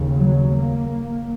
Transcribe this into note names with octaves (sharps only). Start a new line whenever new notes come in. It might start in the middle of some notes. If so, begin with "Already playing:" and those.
Already playing: D#2 C#3
F#3
A#3